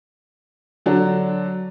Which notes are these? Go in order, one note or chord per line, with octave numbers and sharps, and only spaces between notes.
D3 F#3 D4